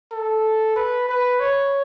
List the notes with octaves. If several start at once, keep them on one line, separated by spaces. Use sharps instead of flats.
A4
B4
B4
C#5